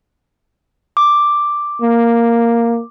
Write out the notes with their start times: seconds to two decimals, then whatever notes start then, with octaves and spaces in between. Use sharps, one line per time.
0.97 D6
1.82 A#3